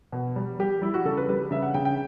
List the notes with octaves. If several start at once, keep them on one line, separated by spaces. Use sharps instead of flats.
B2
G3
G3 G4
G3 E4
F#4
C#3 A4
B4
G3 B4
C#3 E5
F#5
C#3 G5
G5